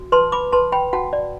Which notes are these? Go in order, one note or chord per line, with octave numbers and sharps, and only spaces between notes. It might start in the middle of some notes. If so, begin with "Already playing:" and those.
Already playing: F#4
B4 A5 C6
B5 D6
B4 A5 C6
G5 B5
F#4 F#5 A5
D5